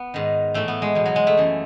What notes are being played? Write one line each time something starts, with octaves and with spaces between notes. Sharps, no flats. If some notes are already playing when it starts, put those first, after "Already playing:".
Already playing: B3
G#2 D#3
A2 E3 A3
B3
G#3
E2 B2
F#3
G#3
A3
F#2 E3